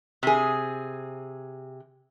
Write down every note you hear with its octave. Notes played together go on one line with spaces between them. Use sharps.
C3 G#4